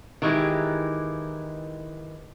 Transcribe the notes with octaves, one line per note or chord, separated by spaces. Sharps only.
D#3 E3 G#3 E4 G4